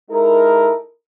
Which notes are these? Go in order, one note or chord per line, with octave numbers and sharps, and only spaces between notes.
G#3 D#4 E4 A4 A#4